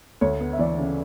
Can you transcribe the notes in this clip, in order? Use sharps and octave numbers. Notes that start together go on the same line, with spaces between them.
D2 C#5
B3
E5
E3 D5
C#3